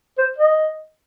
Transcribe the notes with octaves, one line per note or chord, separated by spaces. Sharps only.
C5
D#5